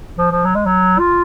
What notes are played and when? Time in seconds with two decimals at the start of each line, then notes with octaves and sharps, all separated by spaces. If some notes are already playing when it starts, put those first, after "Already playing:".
0.18 F3
0.31 F3
0.45 F#3
0.55 G#3
0.65 F#3
0.99 F4